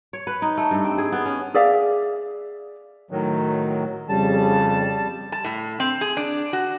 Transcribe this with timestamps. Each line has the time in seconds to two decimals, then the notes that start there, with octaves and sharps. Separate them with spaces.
0.13 C#5
0.27 B4
0.42 D#4
0.57 A3
0.71 G2
0.84 C4
0.98 G#4
1.12 B3
1.26 C#4
1.54 G#4 D5 E5 F5
3.11 A2 D#3 F#3
4.09 F2 C#3 G3 A5
5.32 A5
5.44 A2
5.80 C4
6.01 G#4
6.17 D4
6.53 F#4